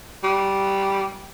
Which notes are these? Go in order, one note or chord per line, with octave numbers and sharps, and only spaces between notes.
G3